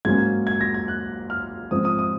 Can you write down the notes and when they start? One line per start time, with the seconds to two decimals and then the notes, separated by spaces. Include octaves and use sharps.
0.05 G#2 F#3 A#3 C#4 G#6
0.47 G#6
0.61 A#6
0.74 G#6
0.88 F#6
1.30 F6
1.71 G#2 F3 C4 D#6
1.85 D#6
1.99 D#6